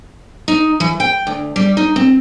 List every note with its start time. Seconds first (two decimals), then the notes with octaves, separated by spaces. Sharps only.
0.48 D#4
0.80 E3
1.00 G5
1.27 D2
1.56 G3
1.77 D#4
1.96 C4